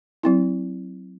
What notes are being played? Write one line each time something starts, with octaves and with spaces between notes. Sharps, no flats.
F#3 C4 E4